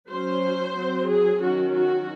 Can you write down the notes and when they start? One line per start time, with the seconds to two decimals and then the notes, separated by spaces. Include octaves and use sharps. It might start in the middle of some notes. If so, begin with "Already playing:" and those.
0.09 F#3 C#4 C5
0.76 F#3 C4
1.08 G#4
1.41 D#3 F#3 C#4 F#4
1.74 F#4